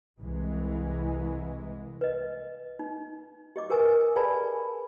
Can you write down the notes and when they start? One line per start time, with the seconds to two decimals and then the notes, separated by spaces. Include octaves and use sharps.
0.21 C2 E3 G#3
2.01 B4 D#5
2.79 D#4
3.56 G4 D#5 D6
3.70 G4 A#4 B4 G#5 D#6
4.16 G#4 B4 D5 G#5 A5 B5